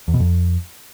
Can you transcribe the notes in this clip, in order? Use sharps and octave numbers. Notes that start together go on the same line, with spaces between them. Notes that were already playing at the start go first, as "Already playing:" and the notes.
E2
B2
F2